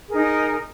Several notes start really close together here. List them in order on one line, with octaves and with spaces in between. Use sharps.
G#4 A#4 D#4